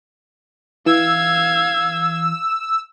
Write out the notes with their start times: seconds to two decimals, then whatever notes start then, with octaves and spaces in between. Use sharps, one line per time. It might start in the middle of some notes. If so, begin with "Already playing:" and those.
0.86 E3 F5 E6 G#6